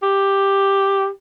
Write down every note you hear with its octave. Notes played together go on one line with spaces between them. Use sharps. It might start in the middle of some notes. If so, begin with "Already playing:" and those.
G4